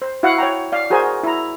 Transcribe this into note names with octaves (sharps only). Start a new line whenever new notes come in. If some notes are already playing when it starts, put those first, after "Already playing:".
C5
E4 F#4 F5 F#5
C#5 G5 A#5
D5 F5
F#4 G#4 A#4 C5 G#5
E4 A#5